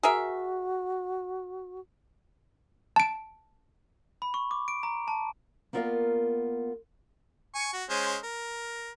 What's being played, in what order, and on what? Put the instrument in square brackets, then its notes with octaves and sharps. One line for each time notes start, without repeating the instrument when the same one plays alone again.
[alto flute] F#4 [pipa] G#4 A#4 E5
[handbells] A5 D7
[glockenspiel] B5
C#6
D6
D7
A#5
A5
[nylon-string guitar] A#3 B3 F4 A#4 D5 F5
[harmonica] G#5 C#6
F#4
G#3 C#4 C5
A#4